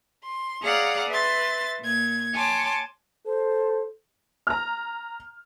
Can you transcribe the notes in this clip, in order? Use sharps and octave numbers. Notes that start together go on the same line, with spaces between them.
C6
G#4 C#5 D5 F5 F#5 A#5
B4 E5 C6 A6
A#2 G#6
C#5 G#5 A5 C6 D6
A4 C5
A#5 F6